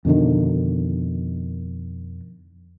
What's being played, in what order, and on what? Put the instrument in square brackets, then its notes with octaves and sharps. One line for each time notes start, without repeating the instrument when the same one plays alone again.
[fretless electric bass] F2 B2 D3 D#3